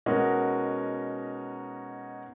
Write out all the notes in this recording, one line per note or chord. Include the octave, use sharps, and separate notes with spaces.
B2 G#3 C#4 D#4 F#4 A#4